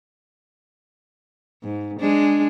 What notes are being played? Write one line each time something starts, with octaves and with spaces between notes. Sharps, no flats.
G#2
G#3 D4